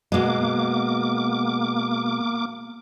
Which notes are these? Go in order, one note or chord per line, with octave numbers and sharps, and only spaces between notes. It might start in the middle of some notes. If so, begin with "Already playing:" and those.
B2 G#3 A#3 D6